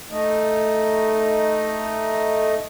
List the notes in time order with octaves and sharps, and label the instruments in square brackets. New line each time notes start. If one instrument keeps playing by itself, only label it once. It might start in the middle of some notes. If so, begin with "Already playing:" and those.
[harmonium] A3 D#4